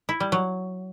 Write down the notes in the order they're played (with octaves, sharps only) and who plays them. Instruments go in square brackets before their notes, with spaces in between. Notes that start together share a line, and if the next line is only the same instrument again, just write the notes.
[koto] E4
G3
F#3